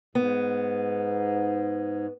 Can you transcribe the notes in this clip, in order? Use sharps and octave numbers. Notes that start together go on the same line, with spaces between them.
G#2 B3